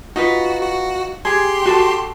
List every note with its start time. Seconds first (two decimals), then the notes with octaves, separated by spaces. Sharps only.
0.16 D#4 F4 F#4 B4
0.62 F#4
1.25 G4 G#4 C6
1.66 F#4 A4 A5